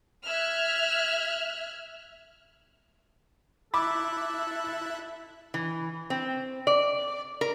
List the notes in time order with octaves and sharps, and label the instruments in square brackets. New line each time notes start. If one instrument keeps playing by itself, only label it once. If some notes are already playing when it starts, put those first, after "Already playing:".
[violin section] E5 F6 F#6 G#6
[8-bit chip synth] E4 E5 F#6 [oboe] A4 [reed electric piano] B5 [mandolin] D6
[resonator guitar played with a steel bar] E3
C4
D5
A#4